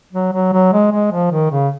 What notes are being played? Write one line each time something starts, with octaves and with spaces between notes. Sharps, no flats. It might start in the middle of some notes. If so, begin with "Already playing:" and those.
F#3
F#3
F#3
G#3
G#3
F3
D#3
C#3